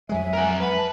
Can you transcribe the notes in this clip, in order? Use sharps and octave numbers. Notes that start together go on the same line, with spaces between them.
F2 F#3 G#3 E5 G#5
A#4 F#5
B4 F#5
A5